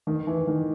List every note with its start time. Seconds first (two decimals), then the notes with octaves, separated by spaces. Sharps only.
0.07 D#3
0.27 E3
0.47 D#3